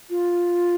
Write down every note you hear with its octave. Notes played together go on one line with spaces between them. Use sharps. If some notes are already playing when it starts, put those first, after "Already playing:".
F4